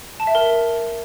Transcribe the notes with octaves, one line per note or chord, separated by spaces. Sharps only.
A5
E5
A#4